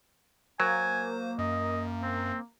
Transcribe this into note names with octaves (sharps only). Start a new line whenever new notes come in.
F#3 A#3 C5 G#5
F#2 D#5
C4